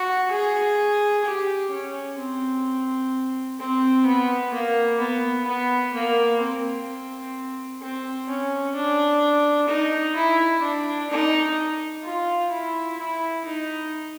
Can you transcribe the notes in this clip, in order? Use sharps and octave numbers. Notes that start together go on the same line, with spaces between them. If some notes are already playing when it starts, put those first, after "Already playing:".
Already playing: F#4
G#4
G4
C#4
C4
C4
B3
A#3
B3
B3
A#3
C4
C4
C#4
D4
D#4
E4
D4
D#4
F4
E4
E4
D#4